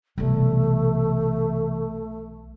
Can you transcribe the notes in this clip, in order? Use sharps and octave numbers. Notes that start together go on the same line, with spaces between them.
B1 C3 E3 G3 A3